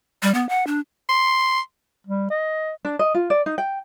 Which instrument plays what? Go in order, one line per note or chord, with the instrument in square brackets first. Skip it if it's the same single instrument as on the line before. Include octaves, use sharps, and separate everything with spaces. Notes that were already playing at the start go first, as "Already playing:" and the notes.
[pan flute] G3
B3
F#5
D4
[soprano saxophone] C6
[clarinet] G3
D#5
[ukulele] D4
D#5
F4
D5
D#4
G5